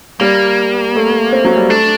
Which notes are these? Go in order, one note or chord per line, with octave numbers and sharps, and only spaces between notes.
G3 A#3
A3
C4
F#3
G3
A3 D4